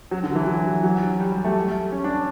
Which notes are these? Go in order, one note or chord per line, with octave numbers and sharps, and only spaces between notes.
F#3
D3
E3
F#3
F#3
G3
G3
A3
C#4
D4